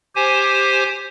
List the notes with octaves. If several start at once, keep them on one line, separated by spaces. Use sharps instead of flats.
G4 C5 G#5